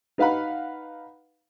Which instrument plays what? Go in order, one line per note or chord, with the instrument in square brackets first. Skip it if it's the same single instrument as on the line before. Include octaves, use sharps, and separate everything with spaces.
[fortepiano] D#4 B4 F5 F#5 B5